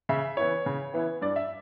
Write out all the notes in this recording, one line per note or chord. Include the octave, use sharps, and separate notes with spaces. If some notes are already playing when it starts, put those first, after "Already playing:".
C#3 E5
E3 B3 E4 C#5
C#3
E3 B3 E4
G2 D5
E5